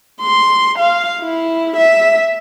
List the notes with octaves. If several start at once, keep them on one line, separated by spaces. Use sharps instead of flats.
C6
F5
E4
E5